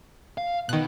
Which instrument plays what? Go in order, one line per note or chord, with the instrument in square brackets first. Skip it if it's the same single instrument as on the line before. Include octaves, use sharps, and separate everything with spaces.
[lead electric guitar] F5
[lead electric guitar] B2 B3 [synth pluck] D#3 F#6